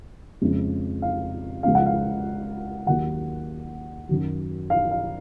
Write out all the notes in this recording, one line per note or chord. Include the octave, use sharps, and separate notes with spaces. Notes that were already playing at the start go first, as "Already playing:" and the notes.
F2 C#3 G#3
F5
C#2 C#3 F3 F5
F#5
F5
D#2 D#3 F#3 F#5
F#2 D#3 F#3
F5
F5